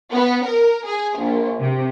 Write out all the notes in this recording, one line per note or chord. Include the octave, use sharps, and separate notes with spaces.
B3
A#4
G#4
A#1
C3